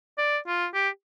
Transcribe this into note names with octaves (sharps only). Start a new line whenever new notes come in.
D5
F4
G4